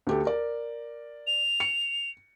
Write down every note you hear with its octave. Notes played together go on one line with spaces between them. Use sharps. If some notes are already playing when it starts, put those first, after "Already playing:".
D2 G4 A4
A#4 D5
F7
C#7